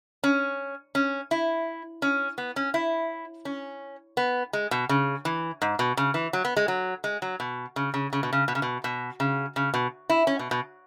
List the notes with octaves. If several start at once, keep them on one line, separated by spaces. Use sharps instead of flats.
C#4
C#4
E4
C#4
B3
C#4
E4
C#4
B3
G#3
B2
C#3
E3
G#2
B2
C#3
E3
F#3
B3
G#3
F#3
G#3
F#3
B2
C#3
C#3
C#3
B2
C#3
B2
C#3
B2
B2
C#3
C#3
B2
E4
C#4
B2
B2